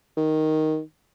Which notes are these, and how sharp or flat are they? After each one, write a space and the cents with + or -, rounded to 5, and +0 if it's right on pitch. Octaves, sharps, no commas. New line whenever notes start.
D#3 +5